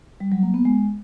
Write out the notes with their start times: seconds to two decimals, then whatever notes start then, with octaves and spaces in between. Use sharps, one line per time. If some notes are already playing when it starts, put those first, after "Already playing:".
0.20 G3
0.32 F#3
0.43 A#3
0.54 B3
0.65 G#3